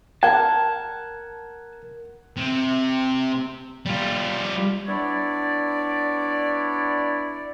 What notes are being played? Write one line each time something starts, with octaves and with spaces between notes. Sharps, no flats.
A#4 F#5 A5 G#6
C3
G3 F4
B3 D4 E4 C#5 D5